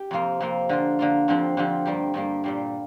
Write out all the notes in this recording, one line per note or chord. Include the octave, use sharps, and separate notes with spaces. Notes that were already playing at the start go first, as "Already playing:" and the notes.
Already playing: G4
F2 C3 A#3 F4
F2 C3 A#3 F4
D3 A#3 F4
D3 A#3 F4
F2 D3 F3 C4 G4
F2 D3 F3 C4 G4
G2 G3 A#3 G4
G2 G3 A#3 G4
A#2 G3 A#3